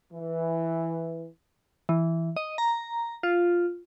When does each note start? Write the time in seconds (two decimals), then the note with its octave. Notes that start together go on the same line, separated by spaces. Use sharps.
0.13 E3
1.89 E3
2.36 D#5
2.58 A#5
3.23 F4